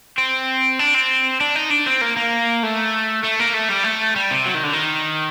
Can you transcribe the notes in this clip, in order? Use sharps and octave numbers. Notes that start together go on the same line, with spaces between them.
C4
D4
C4
D4
D#4
D4
C4
A#3
A#3
A3
A3
A#3
A3
G3
A3
G3
C3
F#3
D#3
D3
D#3